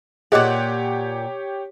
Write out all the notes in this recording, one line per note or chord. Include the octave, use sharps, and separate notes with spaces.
A#2 G4 G#4 C#5 D#5 F#5 G5 D6